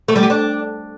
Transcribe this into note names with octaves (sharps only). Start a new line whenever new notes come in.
A3
G3
G4
D4